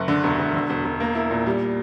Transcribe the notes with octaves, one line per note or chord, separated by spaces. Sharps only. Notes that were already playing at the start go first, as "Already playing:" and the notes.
Already playing: F#1
D3
E1
E1
D3
E1
E1
A#3
E4
A#2
G3